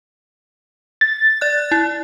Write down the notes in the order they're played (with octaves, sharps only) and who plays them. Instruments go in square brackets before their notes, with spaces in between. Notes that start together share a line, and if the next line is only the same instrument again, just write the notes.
[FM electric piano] A6
[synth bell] D5 F#6
E4